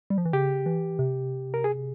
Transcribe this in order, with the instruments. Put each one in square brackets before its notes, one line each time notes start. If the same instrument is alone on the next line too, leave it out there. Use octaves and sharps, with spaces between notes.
[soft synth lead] G3
F3
E3
[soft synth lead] C#3 [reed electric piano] G4
[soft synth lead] E3
C3
[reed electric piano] A#4
G#4